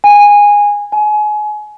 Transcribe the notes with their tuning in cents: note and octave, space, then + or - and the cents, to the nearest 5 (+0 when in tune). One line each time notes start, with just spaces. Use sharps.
G#5 -15
G#5 +30